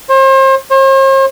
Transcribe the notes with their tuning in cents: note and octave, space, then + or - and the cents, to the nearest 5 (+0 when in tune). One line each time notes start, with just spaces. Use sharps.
C5 +35
C5 +45